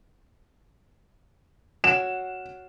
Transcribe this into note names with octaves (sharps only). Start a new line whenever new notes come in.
F#4 C#5 E7